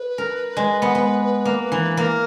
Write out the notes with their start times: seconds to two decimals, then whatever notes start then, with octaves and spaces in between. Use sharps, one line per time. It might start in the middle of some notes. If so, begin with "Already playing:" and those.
Already playing: B4
0.18 A#4
0.57 G#3
0.82 B3
0.95 B3
1.45 A#3
1.72 E3
1.97 A#3 A#4